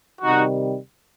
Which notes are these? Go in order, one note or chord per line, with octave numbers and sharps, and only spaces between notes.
C3 D#3 G3 D#4 F#4